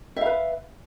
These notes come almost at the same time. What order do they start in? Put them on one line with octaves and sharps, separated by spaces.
E5 F5 B4